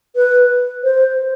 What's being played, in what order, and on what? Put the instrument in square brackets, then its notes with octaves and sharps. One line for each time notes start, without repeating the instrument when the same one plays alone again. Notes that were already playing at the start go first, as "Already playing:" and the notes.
[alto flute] B4
C5